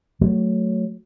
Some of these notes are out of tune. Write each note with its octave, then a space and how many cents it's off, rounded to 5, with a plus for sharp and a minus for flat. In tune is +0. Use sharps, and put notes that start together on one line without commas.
F#3 +0 A3 +0